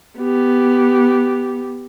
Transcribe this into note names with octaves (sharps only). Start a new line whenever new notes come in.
B3 G4